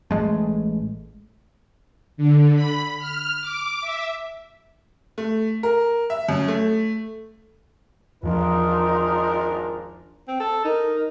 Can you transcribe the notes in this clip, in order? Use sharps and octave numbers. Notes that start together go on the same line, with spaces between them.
A1 G#3 A3
D3
B5
F6
D6
E5
A3
A#4
E5
F#2
A3
G#1 E2 F3 D4 D#4 F4 A#4
C4
A4
D#4 A#4